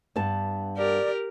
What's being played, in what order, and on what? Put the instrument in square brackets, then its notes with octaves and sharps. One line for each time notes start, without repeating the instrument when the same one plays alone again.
[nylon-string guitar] G2 B3 A5
[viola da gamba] G4 A#4 [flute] D5